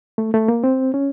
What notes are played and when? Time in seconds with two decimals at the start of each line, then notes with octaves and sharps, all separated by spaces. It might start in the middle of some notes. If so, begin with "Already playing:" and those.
0.18 A3
0.34 A3
0.48 A#3
0.64 C4
0.94 C#4